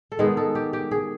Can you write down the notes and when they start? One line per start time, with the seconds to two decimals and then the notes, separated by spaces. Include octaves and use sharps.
0.12 A4
0.19 D#3 G#3 B3 G#4
0.37 A4
0.55 G4
0.73 G4
0.91 G#4